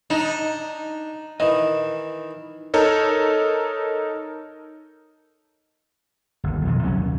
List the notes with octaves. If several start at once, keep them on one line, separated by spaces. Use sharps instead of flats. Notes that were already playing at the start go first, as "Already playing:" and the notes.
D4 D#4
D#3 E3 D#5
D#4 A4 A#4 C#5
G1 D#2
B1 F2 A#2
C3 F#3 C4 C#4
D#2